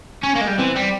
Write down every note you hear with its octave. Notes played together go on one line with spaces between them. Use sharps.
C#4
A#3
G#3
G3
E3 C4
G3